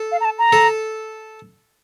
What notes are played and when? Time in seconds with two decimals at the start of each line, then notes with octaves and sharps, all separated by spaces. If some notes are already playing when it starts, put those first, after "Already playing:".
Already playing: A4
0.12 F5
0.20 A#5
0.25 A5
0.39 A#5
0.53 A4